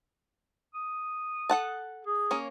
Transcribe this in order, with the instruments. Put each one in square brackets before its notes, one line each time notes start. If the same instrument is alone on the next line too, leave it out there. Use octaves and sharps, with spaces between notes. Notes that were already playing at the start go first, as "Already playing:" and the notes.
[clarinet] D#6
[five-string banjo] A4 F#5 A5
[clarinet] G#4
[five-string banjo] A#3 C#4